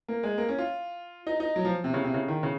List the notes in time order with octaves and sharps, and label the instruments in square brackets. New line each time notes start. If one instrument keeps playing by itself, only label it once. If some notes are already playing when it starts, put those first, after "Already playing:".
[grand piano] A#3
G#3
A#3
C#4
F4
D#4
D#4
F#3
F3
C3
C#3
C3
C#3
D#3
C#3